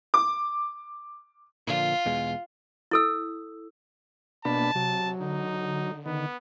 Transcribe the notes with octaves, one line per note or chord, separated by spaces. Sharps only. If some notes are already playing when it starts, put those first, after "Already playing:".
D6
A#2 D3 F3 F4
E2 B2 G#3
E4 A4 E6
B2 A#3 D4 A5 B5
C3 F#3
D3 D#4
D#3 B3